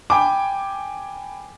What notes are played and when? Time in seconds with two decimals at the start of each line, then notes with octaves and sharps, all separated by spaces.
0.10 G5 G#5 B5 D6